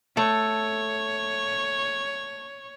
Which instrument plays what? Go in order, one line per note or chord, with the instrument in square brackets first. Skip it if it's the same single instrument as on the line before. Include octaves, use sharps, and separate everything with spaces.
[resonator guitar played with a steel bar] A3 [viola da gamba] C#5